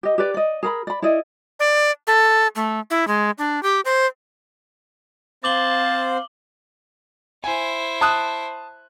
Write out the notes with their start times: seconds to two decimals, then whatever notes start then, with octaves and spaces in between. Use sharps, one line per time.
0.03 G4 D#5
0.18 G4 B4 D5
0.34 D5 D#5
0.63 G#4 A#4 B5
0.87 D5 B5
1.02 E4 G#4 D5 D#5
1.60 D5
2.07 A4
2.56 A3
2.90 E4
3.07 G#3
3.38 D4
3.63 G4
3.85 C5
5.44 C4 C5 F5 A5 D6 F#7 G7
7.44 E4 C5 G#5
8.01 A5 D#6 F#6